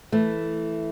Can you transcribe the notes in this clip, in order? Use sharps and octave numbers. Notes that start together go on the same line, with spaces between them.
E3 A3